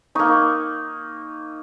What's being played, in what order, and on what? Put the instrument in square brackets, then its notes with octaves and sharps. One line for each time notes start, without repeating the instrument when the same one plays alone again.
[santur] A#3 D#4 C#6